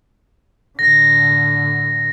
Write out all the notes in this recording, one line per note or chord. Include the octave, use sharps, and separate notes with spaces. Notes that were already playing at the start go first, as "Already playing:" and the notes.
A2 D3 A#6